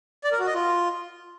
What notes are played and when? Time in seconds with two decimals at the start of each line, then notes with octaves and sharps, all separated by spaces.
0.24 D5
0.32 A#4
0.39 F#4
0.47 D#5
0.54 F4